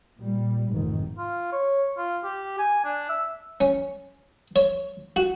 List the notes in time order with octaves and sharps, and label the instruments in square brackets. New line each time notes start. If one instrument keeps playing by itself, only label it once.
[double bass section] A#2 G3
F1 G#2 D#3
[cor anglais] F4
C#5
F4
G4
G#5
D4
E5
[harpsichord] C#4
C#5
F#4